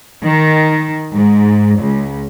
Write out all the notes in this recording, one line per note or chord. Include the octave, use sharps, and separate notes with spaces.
D#3
G#2
C#2